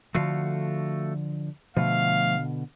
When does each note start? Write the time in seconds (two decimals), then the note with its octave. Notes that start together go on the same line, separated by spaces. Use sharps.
0.15 D3 F3 A3 F#4 F5
1.77 B2 D3 F3 A3 F5